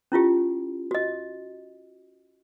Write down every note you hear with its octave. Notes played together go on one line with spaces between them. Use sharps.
C#4 E4 F4 G4
F#4 D#5